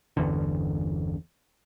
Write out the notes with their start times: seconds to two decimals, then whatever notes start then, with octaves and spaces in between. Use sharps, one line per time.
0.17 G1 E2 D3